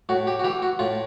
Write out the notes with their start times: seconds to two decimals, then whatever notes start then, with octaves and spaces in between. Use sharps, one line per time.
0.09 A2 F#4
0.27 G4
0.39 F#4
0.44 E3 G4
0.62 F#4
0.79 A2 F4